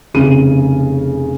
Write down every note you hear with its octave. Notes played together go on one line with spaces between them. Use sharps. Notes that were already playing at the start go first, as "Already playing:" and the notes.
F1 C#3 D#7